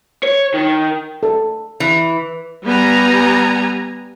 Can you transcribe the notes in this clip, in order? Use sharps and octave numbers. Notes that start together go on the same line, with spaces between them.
C#5
D#3
A4
E3
G3 B3 G#5 A#5